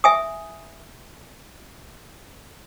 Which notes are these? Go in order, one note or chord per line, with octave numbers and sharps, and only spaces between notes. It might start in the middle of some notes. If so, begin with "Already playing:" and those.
E5 G#5 D#6